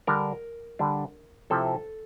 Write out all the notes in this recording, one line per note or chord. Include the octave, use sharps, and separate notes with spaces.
D3 G3 D4 A#4
D3 G3 D4
C3 F3 C4 E4 A4